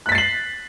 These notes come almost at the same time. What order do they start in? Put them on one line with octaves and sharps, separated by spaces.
F#6 B6 A6 C7 F#7